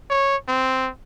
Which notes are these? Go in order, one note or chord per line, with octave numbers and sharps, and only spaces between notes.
C#5
C4